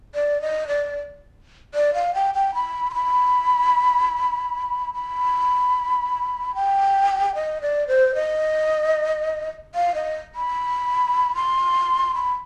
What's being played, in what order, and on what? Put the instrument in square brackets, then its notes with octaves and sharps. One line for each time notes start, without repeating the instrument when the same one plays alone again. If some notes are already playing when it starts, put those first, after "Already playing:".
[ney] D5
D#5
D5
D5
F5
G5
G5
B5
C6
B5
B5
G5
D#5
D5
C5
D#5
F5
D#5
B5
C6
B5